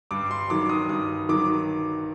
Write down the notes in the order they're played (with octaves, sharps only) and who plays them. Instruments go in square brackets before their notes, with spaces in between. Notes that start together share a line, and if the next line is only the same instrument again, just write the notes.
[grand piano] G2 D6
C6
D#3 F#3 D6
D#6
G2 D#6
D#3 F#3 D6